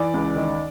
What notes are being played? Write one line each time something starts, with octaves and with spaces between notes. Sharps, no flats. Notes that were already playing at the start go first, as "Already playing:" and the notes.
Already playing: E3 D5
C#2
D#3